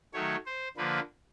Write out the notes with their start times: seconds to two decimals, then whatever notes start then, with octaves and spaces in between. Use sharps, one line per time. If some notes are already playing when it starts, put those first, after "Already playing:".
0.13 D#3 F#3 A3 C#5
0.46 C5
0.77 D3 F3 A#3 B4